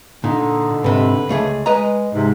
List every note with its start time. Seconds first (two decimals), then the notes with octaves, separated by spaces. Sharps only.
0.24 A#2 D3 D#4
0.84 G#2 C3 B4
1.29 C#2 A3 G#4
1.66 G#3 B4 D#5 A#5
2.14 G#2 C3